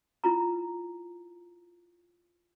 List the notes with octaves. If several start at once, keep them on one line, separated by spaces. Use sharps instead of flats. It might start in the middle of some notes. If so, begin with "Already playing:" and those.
E4 F4 A#5